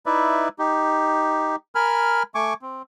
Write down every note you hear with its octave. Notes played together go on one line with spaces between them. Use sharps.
D#4 E4 B4 D5 E5
D#4 G4
A#4 G#5 B5 F6
A3 G#5 C#6 D6
C4